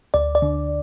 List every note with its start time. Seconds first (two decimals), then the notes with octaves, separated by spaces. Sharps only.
0.14 D2 D5
0.35 D5
0.42 D3